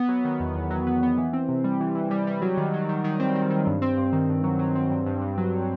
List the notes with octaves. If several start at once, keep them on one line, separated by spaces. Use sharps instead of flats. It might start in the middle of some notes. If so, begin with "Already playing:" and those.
Already playing: B3
F#3
D#3
E2
E2
F#3
B3
B3
E3
C4
C3
G3
E3
E3
G3
G3
F#3
D#3
F#3
D#3
D#3
C4
D#3
D#3
G2
C4
G2
D#3
G2
F#3
F#3
C4
G2
G2
G2
F#3